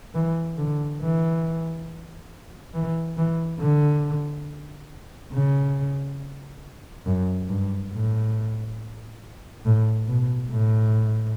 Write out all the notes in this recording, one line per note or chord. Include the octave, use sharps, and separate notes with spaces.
E3
D3
E3
E3
E3
D3
C#3
F#2
G2
A2
A2
B2
A2